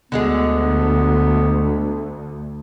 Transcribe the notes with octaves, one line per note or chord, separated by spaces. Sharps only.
D2 D3 G#3 B3 G#4